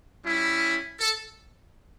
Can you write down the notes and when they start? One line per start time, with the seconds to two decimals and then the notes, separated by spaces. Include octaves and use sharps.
0.24 G3 C#4 E4
1.00 A4